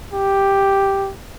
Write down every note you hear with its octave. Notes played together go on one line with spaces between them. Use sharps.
G4